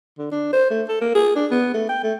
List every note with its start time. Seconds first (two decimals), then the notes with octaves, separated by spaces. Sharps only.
0.18 D3
0.32 D4
0.53 C5
0.71 A3
0.89 A4
1.01 A#3
1.15 G#4
1.36 D4
1.51 B3
1.74 A3
1.89 G5
2.04 A3